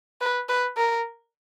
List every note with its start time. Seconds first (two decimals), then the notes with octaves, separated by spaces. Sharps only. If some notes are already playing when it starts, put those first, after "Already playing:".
0.21 B4
0.49 B4
0.77 A#4